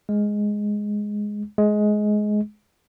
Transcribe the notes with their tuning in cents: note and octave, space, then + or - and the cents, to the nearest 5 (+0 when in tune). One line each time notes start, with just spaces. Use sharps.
G#3 +0
G#3 +15